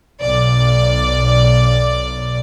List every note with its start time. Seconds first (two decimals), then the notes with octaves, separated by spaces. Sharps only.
0.21 B1 D5